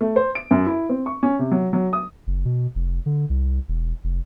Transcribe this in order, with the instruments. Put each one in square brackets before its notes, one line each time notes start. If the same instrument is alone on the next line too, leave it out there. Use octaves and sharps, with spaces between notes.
[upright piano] A3
C5
D7
F#2
E4
C4
C#6
C#4
C3
F#3
F#3
D#6
[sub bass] F#1
B2
F1
D3
C2
E1
F1